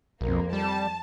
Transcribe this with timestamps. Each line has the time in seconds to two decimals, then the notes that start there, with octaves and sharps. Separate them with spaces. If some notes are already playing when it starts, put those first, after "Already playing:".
0.21 B1 F2 A#3
0.53 G3 A5